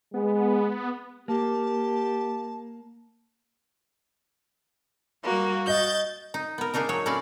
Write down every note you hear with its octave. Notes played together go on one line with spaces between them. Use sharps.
G#3 B3
A#3 G4 A5
G3 A#3 F#4
D#5 G6 A6
D#4
B3 A#4
G#3 A#3 D4 D#4 A#4
F#3 C#5
A2 A#3 C#4 E4 F#4 D5